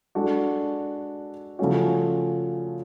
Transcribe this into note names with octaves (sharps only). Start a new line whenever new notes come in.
G#3 D4 F#4 A4
C#3 F3 A3 C#4 F#4